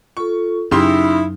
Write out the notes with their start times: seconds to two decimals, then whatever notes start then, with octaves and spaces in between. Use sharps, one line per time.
0.17 F4 A4 C#6
0.71 F#2 C#3 D#4 E4 G4 C6 D#6